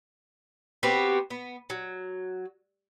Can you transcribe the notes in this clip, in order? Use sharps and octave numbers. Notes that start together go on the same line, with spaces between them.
B3 C4 F#4 G4
B3
F#3